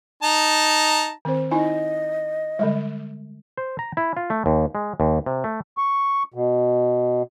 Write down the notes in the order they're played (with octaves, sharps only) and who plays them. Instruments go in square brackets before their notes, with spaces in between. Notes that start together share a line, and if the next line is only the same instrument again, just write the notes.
[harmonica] D#4 A5 A#5
[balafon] D#3 C4 C5
[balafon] D#4 E4 G#5 [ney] D#5
[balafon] D3 G3 G#3
[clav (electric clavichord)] C5
A#5
E4
F4
A3
D#2
G#3
D#2
C3
A3
[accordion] C#6
B2